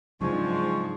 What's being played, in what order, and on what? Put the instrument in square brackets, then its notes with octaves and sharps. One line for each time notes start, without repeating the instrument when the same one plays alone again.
[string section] G#2 C4 [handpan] C#3 F#3 D4 [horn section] F3 G#3 [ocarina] C#6